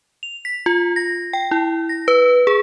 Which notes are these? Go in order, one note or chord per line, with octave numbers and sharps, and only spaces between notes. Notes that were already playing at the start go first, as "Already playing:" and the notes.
F7
B6
F4
A#6
G5
E4
A#6
B4
G#4